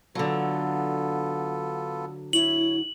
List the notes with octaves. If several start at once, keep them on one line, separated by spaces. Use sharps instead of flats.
D3 F#3 B3 F4 A4
E4 C#5 F#7